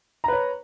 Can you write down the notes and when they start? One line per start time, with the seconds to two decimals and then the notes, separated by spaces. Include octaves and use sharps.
0.24 A#5
0.28 B4
0.33 C#5